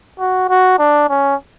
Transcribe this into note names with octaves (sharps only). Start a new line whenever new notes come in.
F#4
F#4
D4
C#4